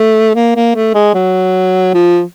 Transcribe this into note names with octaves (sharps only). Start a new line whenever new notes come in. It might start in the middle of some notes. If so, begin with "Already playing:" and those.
Already playing: A3
A#3
A#3
A3
G#3
F#3
F3